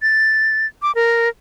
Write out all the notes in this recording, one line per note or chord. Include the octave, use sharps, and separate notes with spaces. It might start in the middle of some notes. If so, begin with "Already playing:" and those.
A6
D6
A#4